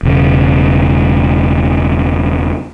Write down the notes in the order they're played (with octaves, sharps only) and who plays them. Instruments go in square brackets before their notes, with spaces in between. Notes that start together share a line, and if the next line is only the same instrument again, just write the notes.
[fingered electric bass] E1 C#3